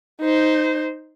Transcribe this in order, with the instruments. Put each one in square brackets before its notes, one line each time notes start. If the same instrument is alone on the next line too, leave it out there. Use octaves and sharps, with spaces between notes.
[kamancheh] D#4 C5